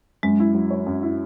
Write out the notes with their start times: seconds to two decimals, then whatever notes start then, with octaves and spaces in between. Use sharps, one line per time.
0.23 F#2 G#3
0.40 E4
0.55 F#3
0.71 C#5
0.86 F#2
1.03 E4